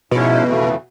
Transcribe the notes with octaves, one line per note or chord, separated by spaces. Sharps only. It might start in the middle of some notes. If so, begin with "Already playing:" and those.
G#2 B2 F3 G#3 C#4 E4
F2 C#3 E3 A3